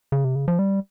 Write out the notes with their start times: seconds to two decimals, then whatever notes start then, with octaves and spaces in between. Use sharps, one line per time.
0.12 C#3
0.24 C3
0.35 C#3
0.48 F3
0.59 G3